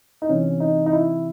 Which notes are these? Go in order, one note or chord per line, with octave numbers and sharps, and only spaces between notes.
D#4
C3 E3 C#4
D#4
D#4
E4